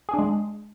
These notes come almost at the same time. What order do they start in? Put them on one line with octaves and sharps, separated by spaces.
G#4 D4 G#3